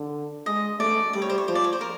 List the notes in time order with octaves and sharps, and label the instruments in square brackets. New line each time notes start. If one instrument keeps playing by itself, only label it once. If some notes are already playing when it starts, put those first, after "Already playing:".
Already playing: [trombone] D3
[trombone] G#3 [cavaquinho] D#5
[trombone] A3 [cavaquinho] D5
[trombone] G3 [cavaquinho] D5
[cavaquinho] C#5
C5
C#5
[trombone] F3 [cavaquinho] C5
[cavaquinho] D5
C#5
C5
A#4